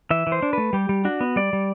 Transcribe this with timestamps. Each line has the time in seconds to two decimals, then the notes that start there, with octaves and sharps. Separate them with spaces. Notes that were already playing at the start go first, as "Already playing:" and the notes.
0.10 E3 E5
0.27 E3
0.32 C5
0.42 D4
0.53 A3 B4
0.73 G3 G4
0.89 G3
1.05 D4 F#4
1.21 B3
1.36 G3 D5
1.53 G3